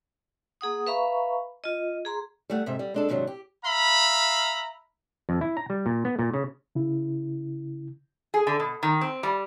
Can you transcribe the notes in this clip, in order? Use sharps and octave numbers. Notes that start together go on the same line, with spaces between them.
A#3 G#4 F#5 D#6
B4 E5 F5 A#5 B5 C#6
F4 D#5
G#4 A#5 C6
G3 A3 F#5
G#2 C3 E5
G3
G#3 D4 A4
G#2 C3 D#3 F#3 D4
G4
E5 F5 A#5 B5
F2
E4
A#5
G3
A#2
B3
A#2
C#3
C#3 E4
G#4
D3
B2
D#3
C4
G3